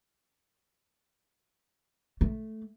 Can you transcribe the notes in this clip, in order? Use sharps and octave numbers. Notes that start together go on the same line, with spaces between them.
A3